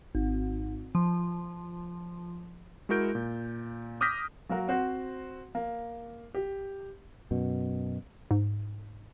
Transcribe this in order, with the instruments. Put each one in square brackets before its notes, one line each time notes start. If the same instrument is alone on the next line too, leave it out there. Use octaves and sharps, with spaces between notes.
[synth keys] G#1
F3
[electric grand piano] G#3 E4 F#4 A#4 G6 D7
A#2
D6 D#6 F6 G6 A#6 B6
[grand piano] F#3 A#3 F#4 A#4
C4 F#4 C5
A#3
G4
[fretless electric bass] F#2 B2
[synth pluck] G#2